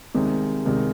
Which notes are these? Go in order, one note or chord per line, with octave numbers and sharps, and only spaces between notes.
C2 C3 D#3 G#3
C2 C3 D#3 G#3